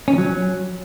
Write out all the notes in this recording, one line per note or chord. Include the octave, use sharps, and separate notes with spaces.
C#4
F3
F#3